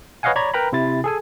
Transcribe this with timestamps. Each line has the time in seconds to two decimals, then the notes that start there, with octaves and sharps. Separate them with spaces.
0.23 B4 C#5 D#5 F5 F#5 G#5
0.36 C#5 D5 A#5 B5 G#6
0.54 A#4 B4 G5 A#5 B5
0.72 C3 E4 A6
1.04 G#4 A4 G#5